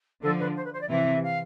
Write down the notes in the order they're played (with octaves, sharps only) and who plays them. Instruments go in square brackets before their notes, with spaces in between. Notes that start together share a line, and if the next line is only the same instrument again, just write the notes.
[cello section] D3 F3 [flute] A4
[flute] B4
C5
B4
C5
D5
[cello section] C3 E3 [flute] E5
[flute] F5